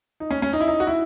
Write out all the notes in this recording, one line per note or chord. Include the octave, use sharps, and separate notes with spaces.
D#4
C#4
C#4
D#4
E4
D#4
F#4
E4